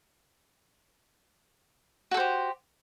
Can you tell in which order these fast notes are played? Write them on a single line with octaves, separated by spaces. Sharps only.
F#4 A4 C5 G4